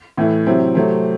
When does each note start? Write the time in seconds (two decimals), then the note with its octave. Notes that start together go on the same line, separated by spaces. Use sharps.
0.17 A2 E3 A3 E4
0.46 C3 F#3 C4 E4
0.75 C3 F#3 A3 C4